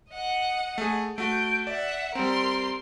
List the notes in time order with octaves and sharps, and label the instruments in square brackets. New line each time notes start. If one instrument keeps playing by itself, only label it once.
[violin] D#5 F#5
[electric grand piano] A3 G#4
[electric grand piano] A3 F#4 [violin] G6 D7
[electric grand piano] D5 [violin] E5 F#5
[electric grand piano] G3 C4 [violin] A#4 C6